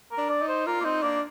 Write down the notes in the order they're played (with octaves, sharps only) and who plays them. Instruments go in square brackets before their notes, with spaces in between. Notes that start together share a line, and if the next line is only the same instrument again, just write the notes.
[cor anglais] A#4
[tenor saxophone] D4
[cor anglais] D5
[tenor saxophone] D#4
[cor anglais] C5
[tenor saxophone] F4 [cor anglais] A#4
[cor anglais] A#3
[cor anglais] C4 [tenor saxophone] D#4
[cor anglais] A#3 [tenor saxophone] D4